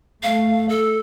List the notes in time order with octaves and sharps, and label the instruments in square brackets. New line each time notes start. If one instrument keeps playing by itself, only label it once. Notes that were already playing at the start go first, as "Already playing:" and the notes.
[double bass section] A3 [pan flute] F5
[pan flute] A4